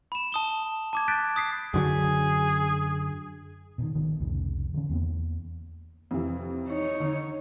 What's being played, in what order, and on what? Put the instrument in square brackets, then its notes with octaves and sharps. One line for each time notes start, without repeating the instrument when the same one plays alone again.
[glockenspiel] B5 E7
A5 D#6 G7
A5 D6 G#6
F#6 G6 A6 B6 D7
D#6 B6 C7
[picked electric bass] F#2 D3 F#3 [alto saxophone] G#4
[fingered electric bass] B2 D3 D#3
G#1 D#3 E3 B3
C2 F2 A2 C#3
D3 E3 C#4
E2 A#3 B3
[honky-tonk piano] F2 C3 E3
[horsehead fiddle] D#4 C#5
[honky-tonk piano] D3